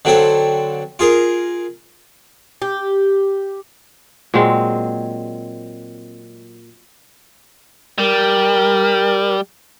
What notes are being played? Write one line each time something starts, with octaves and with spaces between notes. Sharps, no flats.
D3 F#3 C4 A4
F4 G#4 A#4
G4
A#2 F#3 G#3 C4
G3 A#4